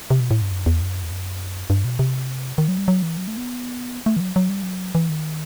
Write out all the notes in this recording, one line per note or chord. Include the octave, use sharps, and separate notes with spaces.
C3
B2
A2
G2
F#2
E2
F#2
E2
F#2
G2
B2
C3
D#3
F#3
G3
F#3
E3
F#3
A3
B3
A3
E3
F#3
F#3
G3
F#3
E3
D#3